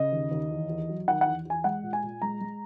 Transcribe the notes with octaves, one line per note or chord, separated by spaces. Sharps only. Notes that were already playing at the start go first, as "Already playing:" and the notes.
Already playing: C#3 D#5
D#2
D#2
E2
E2
F#3
D#3 F#5
F#5
E2
E2 G#5
G#3 F#5
A#2
G#5
A#2
G#3 A#5
G#3